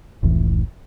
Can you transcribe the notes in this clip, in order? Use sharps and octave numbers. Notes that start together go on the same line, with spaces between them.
F1 C#2 A2 E3